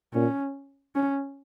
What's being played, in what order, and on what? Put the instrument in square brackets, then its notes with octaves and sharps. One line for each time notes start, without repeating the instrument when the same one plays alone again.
[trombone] A#2 [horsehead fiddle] C#4
[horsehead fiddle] C#4